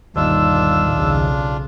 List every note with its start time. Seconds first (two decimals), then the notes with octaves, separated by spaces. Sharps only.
0.16 G1 D#2 B2 D4 F4 E6
0.93 B1 C#3